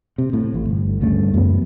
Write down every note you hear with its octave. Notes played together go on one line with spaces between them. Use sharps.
C3
A2
A1
G1
D2 G2 C#3 A3
F#2 E3 B3